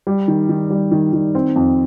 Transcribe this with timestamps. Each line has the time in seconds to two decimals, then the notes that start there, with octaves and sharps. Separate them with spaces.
0.07 G3
0.28 D#3
0.49 D#3
0.70 G3
0.91 D#3
1.13 D#3
1.35 C4
1.56 F2